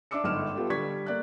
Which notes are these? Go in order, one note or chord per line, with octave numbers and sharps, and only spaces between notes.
D4 E5 D6 E6 C#7
G1 G#2 F6 E7
B3 F4 G4 A4
D3 G3 C#6 G#6 B6
A#3 D5 F#6